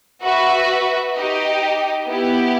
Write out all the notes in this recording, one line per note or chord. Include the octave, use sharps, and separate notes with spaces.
F#4 B4 E5
D#4 G4 D#5
B3 E4 G4